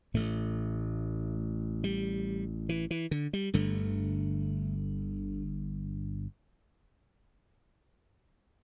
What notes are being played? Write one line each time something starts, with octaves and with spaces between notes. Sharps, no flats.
A1 A2 A3
G3
E3
E3
D3
G3
G1 G2 D3 A3